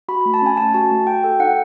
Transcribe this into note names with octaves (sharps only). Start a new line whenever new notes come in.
F#4 B5
B5
A3
A5
C#4 G#5
A3 A5
F#4 A5
A3
F#4 G5
A4 G5
D#4 F#5